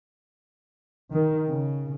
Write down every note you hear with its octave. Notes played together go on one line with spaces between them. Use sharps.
D#3
C#3